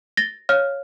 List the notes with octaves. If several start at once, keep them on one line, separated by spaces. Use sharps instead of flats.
A6 A#6 G7
C#5 F5 F6